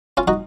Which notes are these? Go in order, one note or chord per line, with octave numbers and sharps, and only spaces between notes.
C#4 F4
D#4 F#4